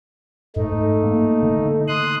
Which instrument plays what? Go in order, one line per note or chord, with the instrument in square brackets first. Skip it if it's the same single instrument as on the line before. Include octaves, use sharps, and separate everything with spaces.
[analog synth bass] G#2 [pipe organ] A3 D#4
[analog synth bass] A#3
D3
[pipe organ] C6 D#6 F#6